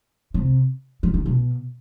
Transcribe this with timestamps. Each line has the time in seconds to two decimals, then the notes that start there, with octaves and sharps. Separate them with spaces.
0.34 C3
1.03 E3
1.14 D#3
1.26 B2